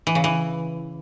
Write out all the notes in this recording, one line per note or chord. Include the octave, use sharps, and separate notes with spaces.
E3
C#3
E3